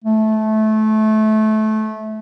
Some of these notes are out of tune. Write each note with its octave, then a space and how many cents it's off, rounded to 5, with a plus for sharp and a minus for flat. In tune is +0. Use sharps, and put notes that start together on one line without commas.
A3 -20